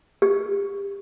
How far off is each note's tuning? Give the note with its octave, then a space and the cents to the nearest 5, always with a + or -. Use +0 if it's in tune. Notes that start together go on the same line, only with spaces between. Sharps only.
G4 +25